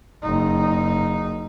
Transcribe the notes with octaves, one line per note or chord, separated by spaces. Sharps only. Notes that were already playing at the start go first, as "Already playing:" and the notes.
F#1 D#4